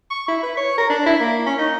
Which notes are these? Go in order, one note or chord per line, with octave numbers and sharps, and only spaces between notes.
C#6
E4
B4
C#5
A#4
D4
E4
A#3
C#4
D#4